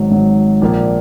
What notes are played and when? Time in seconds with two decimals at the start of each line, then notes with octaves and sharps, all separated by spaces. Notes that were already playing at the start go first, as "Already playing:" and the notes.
Already playing: G#1 G#2 F#3
0.11 G#1 G#2 F#3
0.62 A#1 A#2 A#3